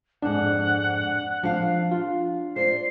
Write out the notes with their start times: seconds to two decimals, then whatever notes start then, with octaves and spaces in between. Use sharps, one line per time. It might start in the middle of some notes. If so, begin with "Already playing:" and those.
0.22 F2 G#2 D4 F#5
1.43 F3 D4 F5
1.91 F4
2.56 C5 D5 C7